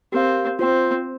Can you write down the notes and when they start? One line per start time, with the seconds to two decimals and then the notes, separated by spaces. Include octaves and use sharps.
0.12 C4 G4 A#4 F5
0.59 C4 F4 C5 G5